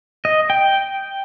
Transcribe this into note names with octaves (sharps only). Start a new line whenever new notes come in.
D#5
G5